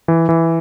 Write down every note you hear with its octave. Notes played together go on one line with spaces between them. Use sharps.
E3
E3